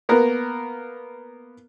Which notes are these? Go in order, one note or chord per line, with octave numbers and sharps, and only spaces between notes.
A#3 B3 A#4